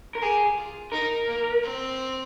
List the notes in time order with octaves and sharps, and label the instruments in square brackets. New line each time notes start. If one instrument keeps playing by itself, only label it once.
[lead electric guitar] A#4
[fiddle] G4 [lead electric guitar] G#4
[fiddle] F4
[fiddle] D#4 [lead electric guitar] A#4
[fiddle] A#3
C4